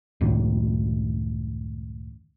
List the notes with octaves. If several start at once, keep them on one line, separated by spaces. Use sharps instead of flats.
C#2 F#2 A2 D#3